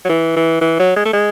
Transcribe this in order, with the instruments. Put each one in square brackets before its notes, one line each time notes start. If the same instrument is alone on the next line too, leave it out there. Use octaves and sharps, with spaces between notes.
[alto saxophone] F#3
E3
E3
E3
F#3
G#3
A3
G#3